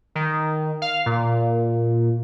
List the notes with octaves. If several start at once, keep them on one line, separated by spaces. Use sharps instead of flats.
D#3
F5
A#2